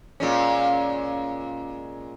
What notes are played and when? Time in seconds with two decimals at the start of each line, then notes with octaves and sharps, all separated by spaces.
0.20 A#2 G#3 C#4